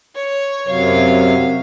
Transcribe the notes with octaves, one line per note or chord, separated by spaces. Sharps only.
C#5
F#2 C3 F#3 C#5 F5